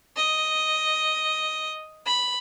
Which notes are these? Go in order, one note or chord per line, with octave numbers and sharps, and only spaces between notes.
D#5
B5